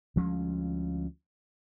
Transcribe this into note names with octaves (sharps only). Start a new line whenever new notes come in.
D2 F3 G#3 C#4